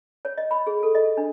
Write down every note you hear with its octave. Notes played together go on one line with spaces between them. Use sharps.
C#5
D#5
B5
G#4
A4
D#5
D4